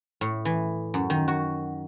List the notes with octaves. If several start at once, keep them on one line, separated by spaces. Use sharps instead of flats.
A2
E3
F#2
D#3
F#4